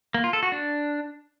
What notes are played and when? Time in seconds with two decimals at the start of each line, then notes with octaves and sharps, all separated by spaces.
0.14 A#3
0.24 F4
0.33 A4
0.43 F#4
0.52 D4